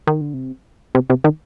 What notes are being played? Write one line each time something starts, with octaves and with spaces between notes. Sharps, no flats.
D#3
D3
C3
C3
C3
D#3